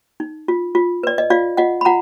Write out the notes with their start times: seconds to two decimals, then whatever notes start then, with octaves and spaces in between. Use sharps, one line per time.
0.20 D#4
0.48 F4
0.75 F4
1.03 B4 D5
1.18 D#5
1.30 F4 D5 F5
1.57 F4 D#5 F#5
1.81 B5
1.85 F4 F#5 A#5